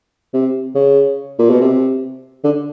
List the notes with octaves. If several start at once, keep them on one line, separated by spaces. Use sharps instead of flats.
C3
C#3
A#2
B2
C3
D3